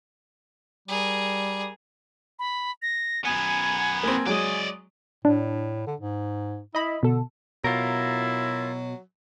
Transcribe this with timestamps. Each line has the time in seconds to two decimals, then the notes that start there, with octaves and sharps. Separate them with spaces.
0.88 G3 G#4 A#4
2.39 B5
2.82 A#6
3.24 F#2 B3 G#5
4.03 A#3 C4 G#5
4.26 F#3 G#3 D5 D#5
5.25 A2 D4
5.87 D3
6.00 G#2
6.75 E4 D#5 B5
7.03 B2 D3 A4
7.64 B2 F#3 E4 F4 A#4